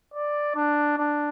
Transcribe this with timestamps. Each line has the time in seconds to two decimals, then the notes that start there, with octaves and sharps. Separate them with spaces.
0.14 D5
0.56 D4
0.98 D4